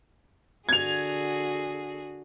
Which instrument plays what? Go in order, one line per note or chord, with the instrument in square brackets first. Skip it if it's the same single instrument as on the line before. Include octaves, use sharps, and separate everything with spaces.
[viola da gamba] D3 F#4 G#4 [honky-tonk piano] G#6 F7